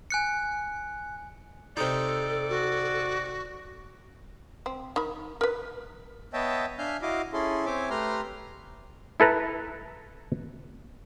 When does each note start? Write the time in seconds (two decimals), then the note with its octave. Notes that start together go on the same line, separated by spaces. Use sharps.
0.10 G#5 F#6 C#7
1.77 C3 D#4 A4 D5
2.49 F#4
4.66 C4
4.96 D#3 B5
5.41 A#4 B4
6.33 B3 C#5 D#5 E5 G5 A5
6.78 D4 E5 F5 G#5 F6 G6
7.02 E4 F#4 D#5 F5 D6
7.33 C#4 E4 G#4 A4 C6
7.66 C4 C#5 E5 G#5 D6
7.90 A3 G4 B4 A#5 C6 F6
9.20 E4 A4 B4 A#5